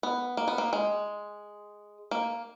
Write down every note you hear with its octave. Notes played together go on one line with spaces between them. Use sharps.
B3
A#3
B3
A#3
G#3
A#3